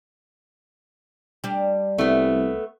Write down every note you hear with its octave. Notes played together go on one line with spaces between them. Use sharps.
G3 D4
C2 A3 B3